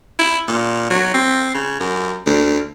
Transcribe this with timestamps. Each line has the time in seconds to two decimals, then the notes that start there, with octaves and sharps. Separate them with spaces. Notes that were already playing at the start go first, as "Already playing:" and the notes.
0.19 E4
0.48 A#2
0.90 F#3
1.14 C4
1.55 C#3
1.80 F#2
2.26 D2